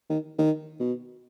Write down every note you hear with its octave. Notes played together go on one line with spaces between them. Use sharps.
D#3
D#3
B2